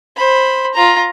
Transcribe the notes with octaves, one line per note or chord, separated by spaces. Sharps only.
C5 B5
F4 A#5